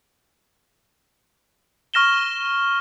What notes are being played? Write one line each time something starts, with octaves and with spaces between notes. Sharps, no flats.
C#6 F6 A#6 E7 G7